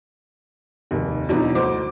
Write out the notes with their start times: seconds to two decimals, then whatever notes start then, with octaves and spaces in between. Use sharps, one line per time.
0.91 F1 D#2
1.29 E2 B2 E3 F#3 D4 D#4
1.55 D2 C5 D6